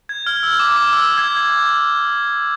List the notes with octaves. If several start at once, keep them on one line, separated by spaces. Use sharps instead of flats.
G#6
F6
E6
D6
D6
E6
G#6